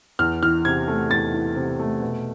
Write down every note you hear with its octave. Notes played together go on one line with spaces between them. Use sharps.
E2 F6
E3 F6
C3 G#6
A3
E2 A6
E3
C3
A3
B2